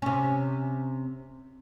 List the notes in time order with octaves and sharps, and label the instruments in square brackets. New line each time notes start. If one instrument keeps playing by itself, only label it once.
[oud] C3 C#4